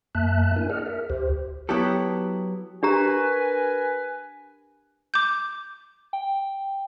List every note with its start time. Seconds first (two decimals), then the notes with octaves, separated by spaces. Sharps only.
0.15 F#2 A#3 E5 A5 F#6
0.56 D4 E4 A#4 G#5
0.70 G#4 D5 D#5 F#5 F6
0.86 A#4 E5
1.10 D2 G4 C5
1.69 F#3 B3 E4 G4 A4
2.83 D4 G4 A#4 B4 G#5 A#5
5.14 D6 G6
6.13 G5